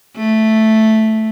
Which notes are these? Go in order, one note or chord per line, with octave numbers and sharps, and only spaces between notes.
A3